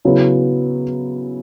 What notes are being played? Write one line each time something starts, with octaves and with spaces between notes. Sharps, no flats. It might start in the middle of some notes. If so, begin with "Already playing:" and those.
C#3 F#3 B3 E4